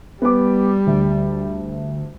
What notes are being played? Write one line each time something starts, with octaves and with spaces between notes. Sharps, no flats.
G3 B3 B4 D6
D2